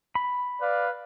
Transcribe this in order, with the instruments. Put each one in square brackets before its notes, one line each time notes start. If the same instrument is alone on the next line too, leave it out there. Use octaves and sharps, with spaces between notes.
[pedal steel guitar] B5
[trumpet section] B4 D5 F5